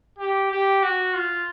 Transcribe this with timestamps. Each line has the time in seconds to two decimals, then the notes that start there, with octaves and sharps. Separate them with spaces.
0.18 G4
0.51 G4
0.83 F#4
1.14 F4